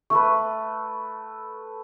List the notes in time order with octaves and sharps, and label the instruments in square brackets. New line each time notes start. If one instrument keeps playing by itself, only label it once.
[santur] A3 A4 B4 [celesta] C#6